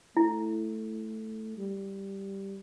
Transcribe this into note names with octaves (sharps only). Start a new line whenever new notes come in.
A3 E4
G3